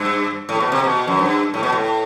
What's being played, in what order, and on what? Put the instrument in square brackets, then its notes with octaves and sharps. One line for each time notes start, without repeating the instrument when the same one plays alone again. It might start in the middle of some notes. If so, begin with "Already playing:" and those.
Already playing: [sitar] G2
A2
B2
C3
B2
F#2
G2
A2
B2
A2